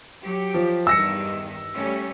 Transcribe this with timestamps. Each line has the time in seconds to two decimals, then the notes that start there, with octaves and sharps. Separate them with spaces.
0.23 F#3 G4
0.54 F3
0.87 E2 G2 D#3 E6 A#6 C#7
1.74 G3 A3 C#4